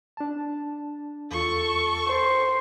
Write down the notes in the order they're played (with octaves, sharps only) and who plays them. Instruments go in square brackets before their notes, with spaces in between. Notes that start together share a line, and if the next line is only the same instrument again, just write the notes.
[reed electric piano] D4 A5
[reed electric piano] E2 F4 [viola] A4 C#6
[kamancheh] C5